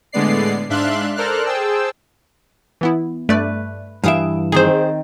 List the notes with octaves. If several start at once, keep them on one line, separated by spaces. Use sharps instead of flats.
A2 D3 G#3 B3 D5 C7
G#2 D4 E5 F5 C6 F#6
A4 A#4 C5 D5 F6 F#6
G#4 C5 G5 A5 E6
E3 B3 E4
G2 A3 B4 D5
G2 E3 E5 F5 D#6 D7
D#3 C4 G#4 C5